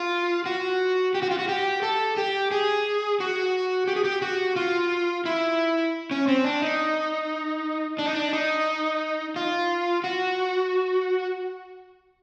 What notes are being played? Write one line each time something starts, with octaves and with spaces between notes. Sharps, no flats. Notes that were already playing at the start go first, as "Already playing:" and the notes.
Already playing: F4
F#4
G4
F#4
F4
F#4
G4
A4
G4
G#4
F#4
G4
G#4
G4
F#4
F4
E4
C#4
C4
D4
D#4
D4
D#4
D4
D#4
F4
F#4